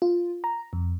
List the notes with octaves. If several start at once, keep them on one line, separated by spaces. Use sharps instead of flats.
F4
A#5
F2